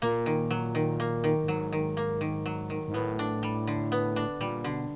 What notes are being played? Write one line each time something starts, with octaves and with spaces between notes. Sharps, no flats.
A#2 A#3
D#3
F#3
D#3
A#3
D#3
A2
G#2 F#3
D#3
A#3
D#3
F#3
D#3
G#2
A2 B3
D4
G3
D3
B3
D4
A#2 G3
B2 D3